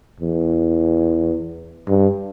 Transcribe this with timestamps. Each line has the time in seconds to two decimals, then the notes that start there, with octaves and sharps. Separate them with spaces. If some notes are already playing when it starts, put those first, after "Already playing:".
0.20 E2
1.88 G2